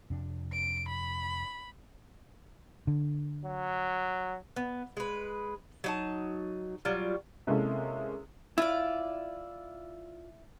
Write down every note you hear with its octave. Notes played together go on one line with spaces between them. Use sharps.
F2 C3 D4
D7
B5
D3
F#3
B3
G#3 B4
F#3 D#4 A5
F#3 G3 F4
C3 G#3 A#3 C#4 E4 A4
E4 F4 D5